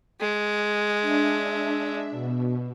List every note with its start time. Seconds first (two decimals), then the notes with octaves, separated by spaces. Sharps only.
0.20 G#3
1.02 D4 E5
2.11 B2